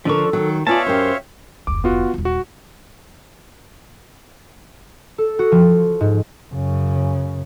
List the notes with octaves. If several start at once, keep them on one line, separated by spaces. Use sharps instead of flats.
D3 F3 D4 A4 A#4 C#6
D#3 F#3
B3 F4 C#5 D5 E5 F5 G#5 A5
F#2 G4 A#4 C5
F1 D2 D6
B3 F4 F#4
D#1 D#4
F#4
A4
F#4
F3
G#2
F#2 C#3